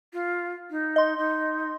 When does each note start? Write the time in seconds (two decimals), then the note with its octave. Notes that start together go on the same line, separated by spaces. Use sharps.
0.13 F4
0.70 D#4
0.96 D#5 C6
1.18 D#4